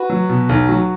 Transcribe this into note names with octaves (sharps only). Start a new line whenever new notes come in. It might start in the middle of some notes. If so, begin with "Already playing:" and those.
Already playing: F#4 B4
F#3
B2
B1
F#3